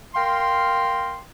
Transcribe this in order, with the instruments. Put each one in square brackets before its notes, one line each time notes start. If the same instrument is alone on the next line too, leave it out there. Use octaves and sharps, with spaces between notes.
[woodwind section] A#4 F5 G5 C6